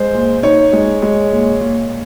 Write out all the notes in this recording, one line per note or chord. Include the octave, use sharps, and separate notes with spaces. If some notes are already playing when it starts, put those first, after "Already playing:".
Already playing: G#3 C5
A#2
D#4 C#5
G#3
G#3
A#2
A#2